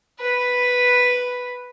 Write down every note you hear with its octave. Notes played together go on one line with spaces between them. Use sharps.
B4 B5